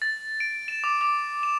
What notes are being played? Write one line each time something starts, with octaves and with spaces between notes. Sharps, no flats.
A6
D7
E7
D6
D6
E7